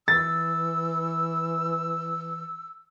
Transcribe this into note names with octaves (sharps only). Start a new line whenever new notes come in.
E3 E6 A6